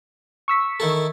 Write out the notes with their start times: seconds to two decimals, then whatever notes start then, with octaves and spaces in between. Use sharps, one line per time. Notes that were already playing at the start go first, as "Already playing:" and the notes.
0.48 C#6 E6 B6
0.80 D#3 E4 A4